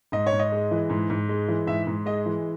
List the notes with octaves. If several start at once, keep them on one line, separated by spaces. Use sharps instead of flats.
G#2 D#5
C#5
G#2
D#5
G#3
E3
G#2
G#2
G#3
E3
G#2 E5
G#2
G#3 D#5
E3